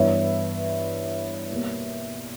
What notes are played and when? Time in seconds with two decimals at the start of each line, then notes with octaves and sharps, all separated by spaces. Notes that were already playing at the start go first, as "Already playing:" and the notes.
Already playing: G2 E3 B3 E4 C#5 E5
1.50 E2 B2 G3 A#3